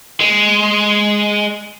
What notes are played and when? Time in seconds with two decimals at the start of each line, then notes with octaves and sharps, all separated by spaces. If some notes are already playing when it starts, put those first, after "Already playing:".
0.20 G#3